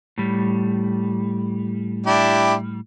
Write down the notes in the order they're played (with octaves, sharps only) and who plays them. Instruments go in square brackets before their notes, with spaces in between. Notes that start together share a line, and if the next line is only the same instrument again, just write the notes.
[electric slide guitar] A2 G3
[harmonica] D4 E4 G4